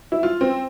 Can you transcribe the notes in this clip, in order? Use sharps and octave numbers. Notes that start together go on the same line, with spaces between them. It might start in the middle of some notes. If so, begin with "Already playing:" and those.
E4
F4
C4